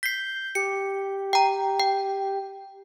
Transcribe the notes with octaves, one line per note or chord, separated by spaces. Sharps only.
G6 B6 C7
G4 C#7
G5 A#5
G5